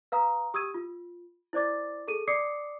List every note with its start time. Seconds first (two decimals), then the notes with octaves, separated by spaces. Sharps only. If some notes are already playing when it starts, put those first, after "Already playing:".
0.12 B4 F5 A#5 D#6
0.54 G4 D#6 E6 G#6 D#7
0.74 F4
1.53 E4 C5 D5 D6 A6
2.08 G#4 A4 D#7
2.28 D5 D6 D#6 C7 C#7